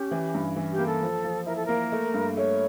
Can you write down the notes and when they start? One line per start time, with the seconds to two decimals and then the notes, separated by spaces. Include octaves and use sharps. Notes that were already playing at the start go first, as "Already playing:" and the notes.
Already playing: C#4 G4
0.11 E3
0.34 G2
0.56 E3
0.72 G4
0.78 A#3
0.87 A4
1.02 F3
1.24 F3
1.46 E4 A#4
1.56 A4
1.65 A#3 A#4
1.92 A3
2.14 G2
2.37 A3 C#5